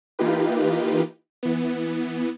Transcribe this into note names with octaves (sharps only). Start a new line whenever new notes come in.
E3 A#3 D#4 F4 G4 B4
E3 B3